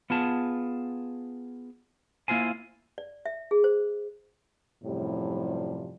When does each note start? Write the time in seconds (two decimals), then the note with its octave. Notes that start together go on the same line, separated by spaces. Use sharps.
0.10 B3 F4 G#4 A5
2.28 A#3 E4 F4 C5 G#5
2.98 D5
3.26 E5
3.51 G#4
3.64 C5
4.84 F#2 A2 C3 F3 G3